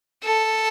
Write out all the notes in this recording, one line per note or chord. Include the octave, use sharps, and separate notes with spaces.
A4